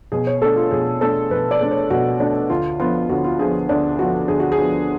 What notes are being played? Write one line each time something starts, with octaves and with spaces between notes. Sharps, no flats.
B2 G#4
C#5
A3 D4 A4
F4
B2 G#4
A3 D4 A4
B2 B4
D5
A3 D4
C#5
B2 F#4
A3 D4
D2 F4
D3 F3 B3 F4
D2 F#4
F4
D3 F3 B3 G#4
D2 D4
D3 F3 B3 F#4
D2 G#4
F#4
G#4
D3 F3 B3